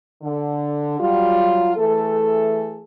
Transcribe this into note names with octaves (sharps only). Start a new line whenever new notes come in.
D3
F#3 G3 F4
E3 A3 G#4 A4